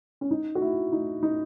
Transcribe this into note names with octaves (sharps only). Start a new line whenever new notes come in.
C#4
D#4
F#4
E4
D#4
D#4